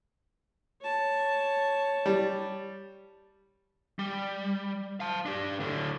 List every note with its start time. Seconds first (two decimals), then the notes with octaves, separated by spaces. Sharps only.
0.81 C#5 A5
2.06 G3
3.99 G3
5.00 F5 A5
5.26 D4 G4
5.60 A2 D3